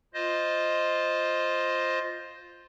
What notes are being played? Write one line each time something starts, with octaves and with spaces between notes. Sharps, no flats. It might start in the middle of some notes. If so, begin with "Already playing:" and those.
F4 C5 D#5